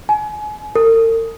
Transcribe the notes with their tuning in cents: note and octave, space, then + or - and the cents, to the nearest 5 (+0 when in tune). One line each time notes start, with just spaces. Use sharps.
G#5 +30
A#4 -45